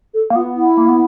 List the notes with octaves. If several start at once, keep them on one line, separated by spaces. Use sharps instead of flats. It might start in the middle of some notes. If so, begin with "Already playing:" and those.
A4
A#3
B3 F4
E4
A#3
B3